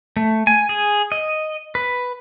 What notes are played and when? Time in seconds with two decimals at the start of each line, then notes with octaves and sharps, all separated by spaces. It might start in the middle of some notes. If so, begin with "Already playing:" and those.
0.17 A3
0.47 G#5
0.69 G#4
1.12 D#5
1.75 B4